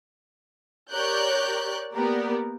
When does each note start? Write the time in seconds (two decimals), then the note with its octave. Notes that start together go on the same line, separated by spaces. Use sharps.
0.92 G4 A#4 C#5 D5 F#6 G6
1.95 A#3 B3 G4 A#4 D5